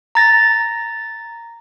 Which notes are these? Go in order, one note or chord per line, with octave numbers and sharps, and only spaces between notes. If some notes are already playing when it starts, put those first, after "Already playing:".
A#5 A6 A#6